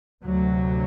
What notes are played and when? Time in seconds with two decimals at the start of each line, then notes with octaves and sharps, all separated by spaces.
0.23 D2 C3 F#3